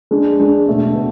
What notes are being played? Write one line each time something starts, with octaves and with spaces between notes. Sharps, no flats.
G#3 D4 G#4
G#3 D4 G#4
B2 A3 D4
B2